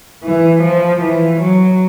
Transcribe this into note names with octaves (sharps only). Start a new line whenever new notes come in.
E3
F3
E3
F#3